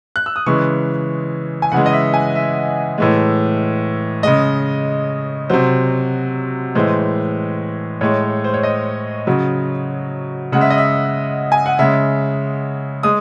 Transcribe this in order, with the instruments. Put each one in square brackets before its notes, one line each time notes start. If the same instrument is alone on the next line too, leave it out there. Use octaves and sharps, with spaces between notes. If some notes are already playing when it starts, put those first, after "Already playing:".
[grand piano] F#6
E6
D#6
C#3 E3 G#3 C#6
G#5
C#3 E3 G#3 F#5
D#5
E5
G#5
E5
A2 E3 G#3
C#3 G#3 D#5
C3 F#3 C5
A2 E3 G#3 C5
A2 G#3 C#5
C5
C#5
D#5
C#3 F#3
C#3 G#3 F#5
E5
D#5
E5
G#5
F#5
C#3 G#3 E5
G#3 D#6